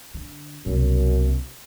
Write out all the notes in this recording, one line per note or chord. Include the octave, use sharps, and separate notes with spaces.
D3
C2 F#2 B2